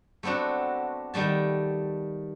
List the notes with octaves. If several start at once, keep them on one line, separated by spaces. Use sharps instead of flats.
A3 B3 C4 D4 F#4
D#3 G3 A3 A5